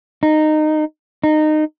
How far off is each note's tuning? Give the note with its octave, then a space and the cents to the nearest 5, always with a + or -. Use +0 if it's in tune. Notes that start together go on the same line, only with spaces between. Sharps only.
D#4 -15
D#4 -20